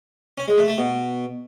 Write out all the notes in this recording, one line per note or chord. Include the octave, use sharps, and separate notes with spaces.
C#4
G#3
A3
A3
B2